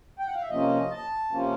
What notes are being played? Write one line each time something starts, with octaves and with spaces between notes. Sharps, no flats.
G5
F#5
F5
E5
C3 F3 A#3 C#4 D#5
A5
C3 F3 A#3 C#4